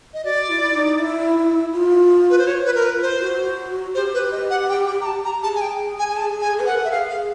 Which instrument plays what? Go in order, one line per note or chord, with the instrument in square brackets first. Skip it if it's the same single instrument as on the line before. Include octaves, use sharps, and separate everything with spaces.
[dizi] D#5
[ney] F#4 [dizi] D5
[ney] E4
D#4
E4
F4
[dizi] B4
C5
[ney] F#4 [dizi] C#5
[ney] F4
[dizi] B4
A#4
B4
C5
[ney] F#4
[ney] G4 [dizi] C5
[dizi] B4
D#5
F#5
G5
G5
A#5
A5
A#5
[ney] G#4 [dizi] A5
[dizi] G#5
G5
G#5
G#5
A5
G#5
[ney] B4
[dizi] F#5
[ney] A#4
[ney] A4 [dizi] E5
[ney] G#4 [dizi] F5
[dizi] F5